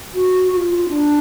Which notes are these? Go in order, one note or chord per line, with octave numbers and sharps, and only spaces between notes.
F#4
F#4
F4
D4